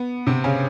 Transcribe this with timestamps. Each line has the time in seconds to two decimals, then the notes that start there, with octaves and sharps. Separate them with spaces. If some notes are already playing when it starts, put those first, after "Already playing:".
Already playing: B3
0.27 C3 C4
0.44 C#3 C#4